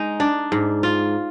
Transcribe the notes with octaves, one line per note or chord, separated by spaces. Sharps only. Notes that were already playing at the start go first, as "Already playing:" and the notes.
Already playing: G#3 D#4
D4
G#2
F4